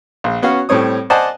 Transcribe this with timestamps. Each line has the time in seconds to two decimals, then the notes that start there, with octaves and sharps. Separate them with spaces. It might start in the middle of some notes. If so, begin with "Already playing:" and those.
0.24 A#1
0.42 B3 C#4 F#4 F5
0.69 A2 G3 C4 C#5 D#6
1.10 C5 D5 D#5 F#5 G#5 A5